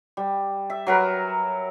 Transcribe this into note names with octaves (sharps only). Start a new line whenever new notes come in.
G3
E5
F#3 A#4 B4